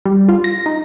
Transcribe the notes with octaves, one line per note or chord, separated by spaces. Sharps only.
G3
F4
A#6
D#4